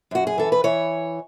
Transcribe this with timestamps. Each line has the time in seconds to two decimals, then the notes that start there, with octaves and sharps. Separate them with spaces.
0.11 F#2 F#4
0.27 G#4
0.38 E3 A4
0.52 B4
0.64 E3 C#5